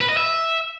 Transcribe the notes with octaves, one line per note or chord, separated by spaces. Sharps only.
B4
D#5
E5